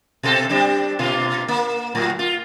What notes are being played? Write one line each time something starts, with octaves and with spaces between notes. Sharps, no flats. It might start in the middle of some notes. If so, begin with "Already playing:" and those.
B2 C4 A4
G3 C4 D4
B2 A#3 F4
A#3
A2 F#3
F4